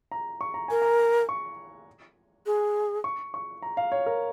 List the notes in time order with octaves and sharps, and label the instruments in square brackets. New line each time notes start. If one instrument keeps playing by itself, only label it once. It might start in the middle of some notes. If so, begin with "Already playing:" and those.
[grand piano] A#5
C#6
A#5
[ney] A#4 [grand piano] G#5
[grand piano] A#5
C#6
[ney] G#4
[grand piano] C#6
C#6
A#5
F5
C#5
A#4